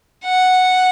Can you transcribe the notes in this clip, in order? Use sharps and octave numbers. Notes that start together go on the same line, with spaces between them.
F#5